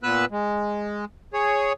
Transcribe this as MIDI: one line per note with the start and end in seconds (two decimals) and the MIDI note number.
0.03 0.25 46
0.03 0.25 59
0.03 0.25 71
0.03 0.25 88
0.03 0.25 90
0.31 1.05 56
1.33 1.73 68
1.33 1.73 73